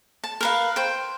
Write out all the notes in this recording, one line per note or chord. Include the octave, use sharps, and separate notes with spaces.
A5
A#4 B4 F5
C5 G5